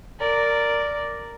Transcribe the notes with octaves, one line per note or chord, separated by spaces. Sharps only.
A#4 D5